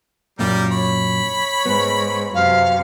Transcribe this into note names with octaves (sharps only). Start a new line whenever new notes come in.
F#2 A#2 G3 G4 A#4
C#5 B5
G#2 B3
F#2 C3 F5